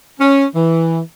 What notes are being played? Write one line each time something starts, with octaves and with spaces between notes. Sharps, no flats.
C#4
E3